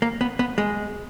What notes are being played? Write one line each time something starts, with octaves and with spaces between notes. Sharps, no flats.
A#3
B3
B3
G#3